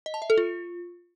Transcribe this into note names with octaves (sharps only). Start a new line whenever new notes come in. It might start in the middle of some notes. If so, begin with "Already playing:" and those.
D#5
A5
E5
A4
F4